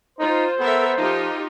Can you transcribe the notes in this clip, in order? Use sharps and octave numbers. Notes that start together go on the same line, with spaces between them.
D#4 F4 C5
B3 A4 A#4 E5
F3 D#4 F4 G4